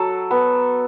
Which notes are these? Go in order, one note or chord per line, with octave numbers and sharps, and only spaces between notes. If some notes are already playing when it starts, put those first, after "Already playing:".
Already playing: F#3 A4
B3